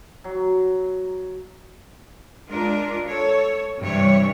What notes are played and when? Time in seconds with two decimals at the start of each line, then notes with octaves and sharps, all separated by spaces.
0.24 F#3
2.48 G#3 D4 F4 A#4
3.06 A4 C#5
3.81 G2 C3 E3 G3 E4 C#5